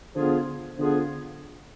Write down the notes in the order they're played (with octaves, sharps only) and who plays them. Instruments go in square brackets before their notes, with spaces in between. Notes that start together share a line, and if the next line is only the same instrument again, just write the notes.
[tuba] D3 [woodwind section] F3 B3 F4 G#4
[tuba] D3 [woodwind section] F3 B3 F4 G#4